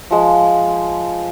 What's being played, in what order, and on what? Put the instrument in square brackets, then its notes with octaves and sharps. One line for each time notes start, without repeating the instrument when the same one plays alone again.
[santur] F3 G#3